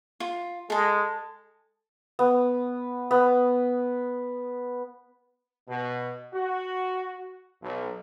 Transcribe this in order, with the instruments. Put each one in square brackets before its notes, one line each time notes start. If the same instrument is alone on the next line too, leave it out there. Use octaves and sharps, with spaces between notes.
[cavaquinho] F4
[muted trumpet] G#3 [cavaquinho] A4 A5
[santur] B3
B3
[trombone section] B2
F#4
B1